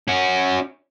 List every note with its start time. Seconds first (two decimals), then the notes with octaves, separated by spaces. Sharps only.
0.08 C#4 F#4